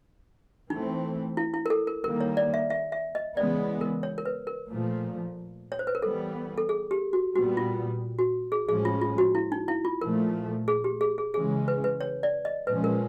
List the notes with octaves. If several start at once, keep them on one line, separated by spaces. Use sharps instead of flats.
E3 A3 C4 D#4
E4
E4
A#4
A4
A#4
D#3 G3 A#3 A#4
C#5
D5
E5
E5
E5
D#5
C#3 E3 G#3 B3 D5
A#4
C#5
A#4
B4
A#4
A#2 F3 A3
C#5
C5
B4
A#4
E3 G3 B3 A4
A4
G#4
G4
F#4
A#2 G3 B3 F#4
F4
F#4
G#4
A2 F3 G#3 C#4 G#4
F4
F4
F#4
E4
D#4
E4
F4
A#2 F3 A3 A#4
G#4
G4
G#4
G#4
C#3 E3 G#3 C#4 G#4
B4
B4
C#5
D5
D#5
A#2 F3 G#3 C#4 B4
A#4